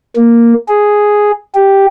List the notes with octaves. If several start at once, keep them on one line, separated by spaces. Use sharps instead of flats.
A#3
G#4
G4